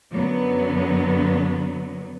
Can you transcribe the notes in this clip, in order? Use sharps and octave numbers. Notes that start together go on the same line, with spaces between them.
F#2 D3 F#3 B3